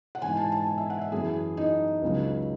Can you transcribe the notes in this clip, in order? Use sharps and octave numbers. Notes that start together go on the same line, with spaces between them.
F#5
G#2 E3 G#5
A5
A5
G#5
E5
F#5
E5
F#2 E3 G#4
D#4
C#2 C#3 F#3